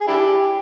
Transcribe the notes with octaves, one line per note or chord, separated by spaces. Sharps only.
G#4
D4 E4 G4